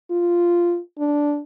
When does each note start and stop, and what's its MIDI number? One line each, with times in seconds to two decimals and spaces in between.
0.11 0.79 65
0.99 1.41 62